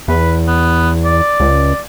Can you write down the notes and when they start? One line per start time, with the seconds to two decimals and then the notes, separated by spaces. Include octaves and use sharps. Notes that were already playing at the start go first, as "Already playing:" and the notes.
0.08 E2 B4
0.47 B3
1.05 D5
1.40 C#2